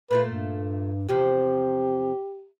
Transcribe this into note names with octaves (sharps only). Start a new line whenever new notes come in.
A#2 A3 F4 B4
G2
E2 C3 F3 G4